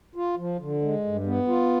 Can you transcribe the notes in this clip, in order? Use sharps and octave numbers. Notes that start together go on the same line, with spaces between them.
F4
F3
D3
G#3
G2
B3
F4